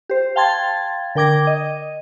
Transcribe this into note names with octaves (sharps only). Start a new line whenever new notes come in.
G4 C5
F5 G5 A5 C6 G#6 A6
D3 A#4 G5 D6 G#6 A#6
D#5